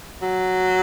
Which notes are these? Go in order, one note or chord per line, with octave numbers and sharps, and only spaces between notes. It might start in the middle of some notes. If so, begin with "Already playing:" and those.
F#3